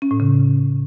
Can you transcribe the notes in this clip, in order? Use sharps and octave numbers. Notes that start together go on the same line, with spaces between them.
C#4
A2
C#3